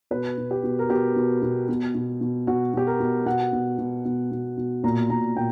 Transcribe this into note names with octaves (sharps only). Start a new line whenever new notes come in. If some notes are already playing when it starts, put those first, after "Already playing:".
B2 B4
B2
G4
B2
A#4
B2 G4
B2
B2
B2
B2
B2
B2 F#4
B2 G4
A#4
B2
B2 F#5
B2
B2
B2
B2
B2
A#2 A#5
A#2 A#5
A#2 G5